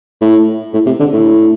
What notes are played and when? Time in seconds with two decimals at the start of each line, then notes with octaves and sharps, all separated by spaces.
0.21 A2
0.74 A2
0.86 C3
1.00 D3
1.13 A2